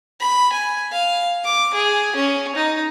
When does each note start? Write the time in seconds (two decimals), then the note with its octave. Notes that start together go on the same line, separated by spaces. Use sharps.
0.20 B5
0.52 G#5
0.92 F5
1.44 D6
1.74 G#4
2.16 C#4
2.56 D#4